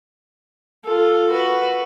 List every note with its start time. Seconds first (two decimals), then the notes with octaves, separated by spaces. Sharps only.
0.84 F4 A4
1.30 F#4 B4